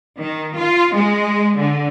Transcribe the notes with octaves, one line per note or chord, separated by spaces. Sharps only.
D#3
F4
G#3
D3